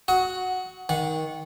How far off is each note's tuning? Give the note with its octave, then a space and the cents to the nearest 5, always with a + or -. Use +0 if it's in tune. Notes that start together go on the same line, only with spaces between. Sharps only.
F#4 +0 F#5 +0 D#6 +40
D#3 +20 F#5 -20